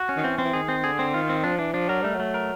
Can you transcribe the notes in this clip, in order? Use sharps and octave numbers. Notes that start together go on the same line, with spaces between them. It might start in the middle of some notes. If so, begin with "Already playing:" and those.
Already playing: F#4
C#4
D#3
E3 C4
C4
E3
D#3 G#4
C4
D3 G#4
C4
D#3 F4
C4
F3 D4
E3 D4
F3 D4
F#3 A#4
G3 A3
F#3
A3
A#4